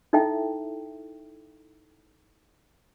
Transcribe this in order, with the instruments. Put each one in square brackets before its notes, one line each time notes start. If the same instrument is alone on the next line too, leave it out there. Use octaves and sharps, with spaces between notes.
[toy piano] D#4 E4 A4 E5 G5